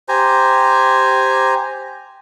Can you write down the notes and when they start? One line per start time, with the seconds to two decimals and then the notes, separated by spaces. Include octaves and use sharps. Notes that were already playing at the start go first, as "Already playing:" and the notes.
0.08 G4 C5 G#5 A#5